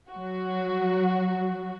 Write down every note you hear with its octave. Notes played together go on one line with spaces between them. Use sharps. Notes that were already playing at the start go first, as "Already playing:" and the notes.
F#3 F#4